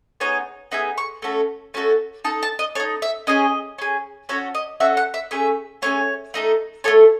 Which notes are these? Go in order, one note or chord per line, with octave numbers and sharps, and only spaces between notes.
B3 D#4 G#4 C#5
B3 D#4 G#4 E5
C#6
A3 C#4 F#4 A4
A3 C#4 F#4 A4
D#4 A4 A5
A5
D#5
D#4 A4 C#5
E5
C#4 G#4 D#5
C#4 G#4
C#4 F#4 A4 C#5
D#5
C#4 F#4 A4 E5
F#5
E5
A3 C#4 G#4 E5
A3 C#4 G#4 C#5
A3 D#4 A4
A3 D#4 A4 C#5